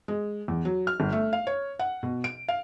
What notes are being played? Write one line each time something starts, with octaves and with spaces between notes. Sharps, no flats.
G#3
E2
F#3
F6
G1
A3
F5
C#5
F#5
B2
D7
F5